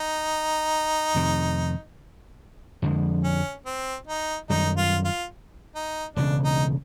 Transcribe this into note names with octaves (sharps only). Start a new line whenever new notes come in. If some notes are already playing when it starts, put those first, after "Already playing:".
Already playing: D#4
F2 C3 D#3
F2 D3 F3 G#3
C#4
C4
D#4
F#2 D#3 G3 D#4
F4
F4
D#4
E1 D2 C#3 D4
D#4